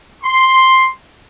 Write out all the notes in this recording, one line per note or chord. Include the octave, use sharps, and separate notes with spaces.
C6